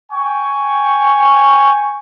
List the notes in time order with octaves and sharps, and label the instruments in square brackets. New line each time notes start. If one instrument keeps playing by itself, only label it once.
[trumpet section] G5 G#5 C#6